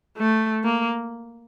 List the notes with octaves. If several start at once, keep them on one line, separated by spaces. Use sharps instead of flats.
A3
A#3